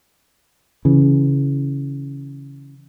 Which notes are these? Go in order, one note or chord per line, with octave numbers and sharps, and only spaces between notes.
C#3 E3